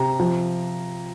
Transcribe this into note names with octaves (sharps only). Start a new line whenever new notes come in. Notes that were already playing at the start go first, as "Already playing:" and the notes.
Already playing: C3 A#5
F3